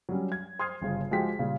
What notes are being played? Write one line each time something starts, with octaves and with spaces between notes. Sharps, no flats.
F#3 G3 C#4
G#6
C5 C6 D#6 F6 G#6 C7
G1 C#3 F4
F3 G#3 F#4 G4 G5 B6
A#2 C#3 G3